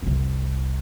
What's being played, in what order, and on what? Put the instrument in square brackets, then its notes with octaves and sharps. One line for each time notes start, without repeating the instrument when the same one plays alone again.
[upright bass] F1 C2